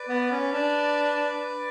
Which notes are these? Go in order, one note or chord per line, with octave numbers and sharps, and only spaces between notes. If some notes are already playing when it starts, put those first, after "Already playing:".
Already playing: B4 D5
B3
C#4
D4